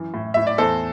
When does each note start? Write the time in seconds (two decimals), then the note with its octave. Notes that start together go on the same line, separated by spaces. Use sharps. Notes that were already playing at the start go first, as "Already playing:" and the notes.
Already playing: F#2 E3
0.14 A2
0.34 A2 E5
0.47 D5
0.58 E2 A4 C5